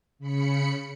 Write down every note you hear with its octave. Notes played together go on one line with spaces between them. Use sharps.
C#3 B5 C#7